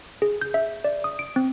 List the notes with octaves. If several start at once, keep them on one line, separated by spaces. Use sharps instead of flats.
G#4
G6
E5
D5
D#6
D7
C4